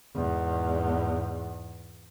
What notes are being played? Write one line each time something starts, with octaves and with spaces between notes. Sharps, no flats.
E2 G#2